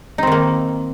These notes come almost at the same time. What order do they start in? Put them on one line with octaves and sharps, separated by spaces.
D#4 C4 D#3 A#3